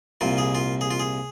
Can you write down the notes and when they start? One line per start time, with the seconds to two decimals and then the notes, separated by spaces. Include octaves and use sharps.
0.21 C2 A#2 F4
0.38 G#4
0.55 F4
0.81 G#4
0.91 F4
0.99 G#4